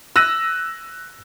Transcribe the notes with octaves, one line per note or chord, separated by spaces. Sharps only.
E6 F#6 A#6 D#7